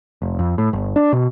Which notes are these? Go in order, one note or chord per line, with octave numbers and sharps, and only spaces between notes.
F1
F2
A2
G1
D4
B2